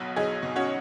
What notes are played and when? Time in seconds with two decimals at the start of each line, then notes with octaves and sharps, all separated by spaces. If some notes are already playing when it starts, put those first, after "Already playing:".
Already playing: B1 B2 F#3
0.16 B1 D#4 G#4
0.43 B2
0.56 C#4 F#4